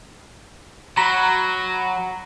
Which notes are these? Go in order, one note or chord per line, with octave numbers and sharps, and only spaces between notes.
F#3 A#5 B5 A#6